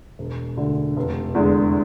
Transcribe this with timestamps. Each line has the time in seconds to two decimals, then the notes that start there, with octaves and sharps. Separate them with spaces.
0.19 E1
0.57 D2 D3
0.97 F1
1.35 E2 D3 G#3